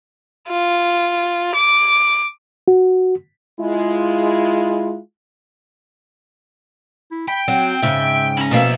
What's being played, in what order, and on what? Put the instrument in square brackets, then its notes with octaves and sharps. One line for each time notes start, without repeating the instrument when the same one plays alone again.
[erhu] F4
D6
[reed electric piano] F#4
[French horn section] G#3 E4 F4
[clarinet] E4
[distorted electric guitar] G5 [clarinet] B5
[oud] F#3 [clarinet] C4
[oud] G#2 C#3 [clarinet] E5
[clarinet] C#4 [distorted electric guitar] E4 A#5
[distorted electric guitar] C2 E5 [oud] B2 F3 A#3